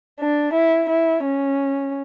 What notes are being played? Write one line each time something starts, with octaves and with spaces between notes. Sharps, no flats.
D4
E4
E4
C#4